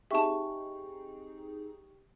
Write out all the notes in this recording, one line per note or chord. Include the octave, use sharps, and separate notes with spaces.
C4 D#4 G4 G#4 E5 G5 A5 C#6